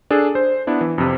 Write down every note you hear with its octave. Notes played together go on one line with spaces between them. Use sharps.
D4 G#4 A4
C5
B3 D4 E4
E3
F2 C3